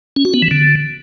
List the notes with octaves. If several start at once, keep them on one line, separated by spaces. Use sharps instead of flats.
C#4
F#4
B3
E3
D3